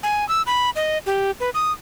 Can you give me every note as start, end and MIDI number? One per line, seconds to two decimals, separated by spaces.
0.03 0.27 80
0.29 0.42 88
0.47 0.70 83
0.76 0.98 75
1.06 1.31 67
1.40 1.50 71
1.54 1.72 87